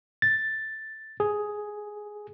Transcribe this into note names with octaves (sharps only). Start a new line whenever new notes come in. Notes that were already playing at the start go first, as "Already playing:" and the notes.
A6
G#4